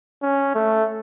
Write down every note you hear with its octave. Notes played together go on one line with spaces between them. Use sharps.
C#4
A3